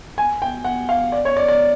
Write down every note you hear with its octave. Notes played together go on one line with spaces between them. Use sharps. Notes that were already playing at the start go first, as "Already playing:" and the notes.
G#5
G5
F#5
F5
D5
C#5
D5
D5